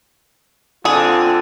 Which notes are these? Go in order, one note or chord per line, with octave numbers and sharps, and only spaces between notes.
D3 C4 F4 G#4